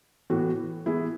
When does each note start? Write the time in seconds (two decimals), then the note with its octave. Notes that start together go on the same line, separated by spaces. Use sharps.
0.30 A2 E3 B3 F#4
0.86 E3 B3 E4 G#4